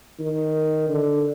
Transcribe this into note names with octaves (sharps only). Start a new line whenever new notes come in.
D#3
D3